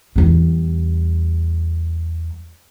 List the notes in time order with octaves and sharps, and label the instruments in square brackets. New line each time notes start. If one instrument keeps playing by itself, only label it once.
[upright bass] E2 G3